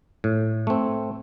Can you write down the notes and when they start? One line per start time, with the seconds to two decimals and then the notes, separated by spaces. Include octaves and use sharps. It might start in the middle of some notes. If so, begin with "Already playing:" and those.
0.24 A2
0.67 A3 C4